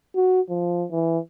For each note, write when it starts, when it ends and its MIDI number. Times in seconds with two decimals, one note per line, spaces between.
0.15 0.41 66
0.49 0.85 53
0.91 1.19 52